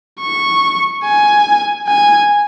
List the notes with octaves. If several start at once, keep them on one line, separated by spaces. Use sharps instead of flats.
C#6
G#5
G#5